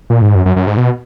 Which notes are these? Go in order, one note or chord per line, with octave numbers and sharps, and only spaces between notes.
A#2
G#2
F#2
F#2
F#2
G#2
B2